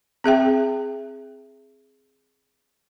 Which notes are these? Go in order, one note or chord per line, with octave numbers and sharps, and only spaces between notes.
C4 G#4 E5 G5